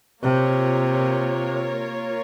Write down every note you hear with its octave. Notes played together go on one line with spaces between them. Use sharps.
C3 A#3 F4 A#4 C#5